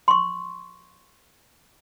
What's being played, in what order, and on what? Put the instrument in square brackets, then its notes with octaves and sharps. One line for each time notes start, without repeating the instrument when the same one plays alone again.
[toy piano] C6 C#6